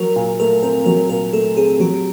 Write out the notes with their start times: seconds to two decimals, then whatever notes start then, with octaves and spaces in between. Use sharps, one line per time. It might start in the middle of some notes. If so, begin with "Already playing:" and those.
Already playing: F#3 A#4
0.16 A#2
0.39 A3 A#4
0.63 C4 A#4
0.86 F#3 A#4
1.10 A#2 A#4
1.33 A3 A4
1.57 C4 G#4
1.80 F#3 G4